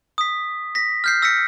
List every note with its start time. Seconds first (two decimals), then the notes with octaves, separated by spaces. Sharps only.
0.18 D#6 B6
0.75 A#6 B6
1.04 F6 G6 C7
1.22 E6 A#6 B6 C#7